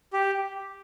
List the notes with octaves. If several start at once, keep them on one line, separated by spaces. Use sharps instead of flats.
G4